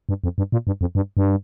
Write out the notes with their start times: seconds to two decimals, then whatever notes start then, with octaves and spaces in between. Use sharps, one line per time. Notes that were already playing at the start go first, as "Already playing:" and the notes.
0.09 G2
0.24 F2
0.38 G2
0.52 A#2
0.67 G2
0.81 F2
0.95 G2
1.17 G2